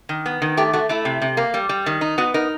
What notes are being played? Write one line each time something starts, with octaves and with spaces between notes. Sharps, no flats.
D#3
B3
D#3
A3 G4
A3 F#4
A3 E4
C3
C3
A#3
G3
G3
D#3
D#4
B3 F#4
D#4 A#4